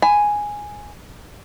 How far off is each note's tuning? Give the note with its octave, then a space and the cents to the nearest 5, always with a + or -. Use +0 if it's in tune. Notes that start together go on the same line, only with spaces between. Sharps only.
G#5 +0 B5 +20